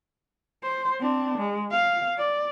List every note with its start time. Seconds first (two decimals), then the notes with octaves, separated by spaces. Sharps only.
0.64 C5
1.00 C4 D4
1.38 G#3
1.71 F5
2.18 D5